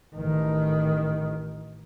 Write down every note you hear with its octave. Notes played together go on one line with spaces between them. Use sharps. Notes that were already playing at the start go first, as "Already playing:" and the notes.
A1 D#3